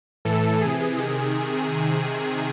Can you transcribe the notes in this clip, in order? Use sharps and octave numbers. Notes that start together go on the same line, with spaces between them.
A2 E3 A4
C3 E3 G#4
C3 D#3